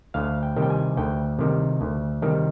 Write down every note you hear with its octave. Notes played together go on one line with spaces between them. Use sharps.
D2 F5
G5
C3 D#3 G3
G5
G#5
D2 G5
C3 D#3 G3
D2
C3 D#3 G3